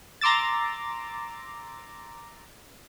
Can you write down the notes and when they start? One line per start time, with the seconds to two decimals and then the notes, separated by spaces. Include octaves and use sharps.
0.21 A#5 C6 D6 E6 A6